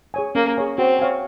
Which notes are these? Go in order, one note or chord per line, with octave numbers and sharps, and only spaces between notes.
G#4 C#5 G#5
A#3 C#4
G#4 C#5 G#5
C4 F#4
C#5 F5 G#5